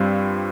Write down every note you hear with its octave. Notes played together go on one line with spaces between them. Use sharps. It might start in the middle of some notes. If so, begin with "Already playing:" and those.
Already playing: G2 G3 C4 F4